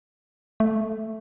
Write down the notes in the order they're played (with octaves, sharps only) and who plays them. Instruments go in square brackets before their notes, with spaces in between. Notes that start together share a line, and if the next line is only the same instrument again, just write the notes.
[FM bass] A3